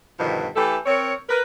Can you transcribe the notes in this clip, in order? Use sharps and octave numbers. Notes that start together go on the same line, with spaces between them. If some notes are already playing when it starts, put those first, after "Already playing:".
G2 B2 D3 D#3 F3
E3 A3 G4 A4
C4 A#4 C#5
A#4 B4